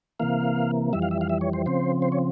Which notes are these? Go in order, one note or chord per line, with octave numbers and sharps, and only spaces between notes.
C3 E3 A#3 F5
F2 E3 G3 E5
F5
E5
F5
E5
C#5
C5
C#3 F3 C4 C5
C5
C#5